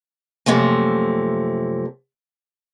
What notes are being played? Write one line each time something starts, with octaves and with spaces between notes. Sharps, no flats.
F#2 C3 F3 A3 A#3